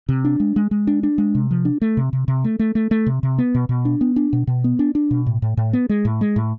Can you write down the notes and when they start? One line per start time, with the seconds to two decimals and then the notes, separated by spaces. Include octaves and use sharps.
0.09 C3
0.25 D4
0.40 G#3
0.56 G#3
0.71 G#3
0.87 D4
1.03 D4
1.18 G#3
1.35 C3
1.51 F3
1.65 D4
1.82 A3
1.97 C3
2.13 C3
2.28 C3
2.44 A3
2.59 A3
2.75 A3
2.91 A3
3.06 C3
3.23 C3
3.38 B3
3.55 B2
3.69 B2
3.85 D4
4.01 B3
4.16 D4
4.33 B2
4.47 B2
4.64 B3
4.79 D4
4.95 D4
5.11 B2
5.26 A2
5.42 A2
5.57 A2
5.73 B3
5.89 G#3
6.05 A2
6.21 G#3
6.36 A2